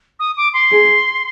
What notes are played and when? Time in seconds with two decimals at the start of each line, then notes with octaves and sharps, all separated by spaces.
0.20 D#6
0.37 D6
0.53 C6
0.71 G#4